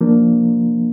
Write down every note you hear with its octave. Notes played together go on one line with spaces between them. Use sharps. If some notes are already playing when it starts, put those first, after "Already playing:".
F3 A#3 D4